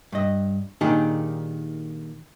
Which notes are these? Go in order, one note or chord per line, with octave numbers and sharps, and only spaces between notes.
G2 D#5
A#2 D#3 D4 D#4 G4 G#4